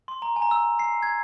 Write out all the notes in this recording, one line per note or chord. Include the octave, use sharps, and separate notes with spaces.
C6
A#5
G#5
A#5
E6
C7
G#6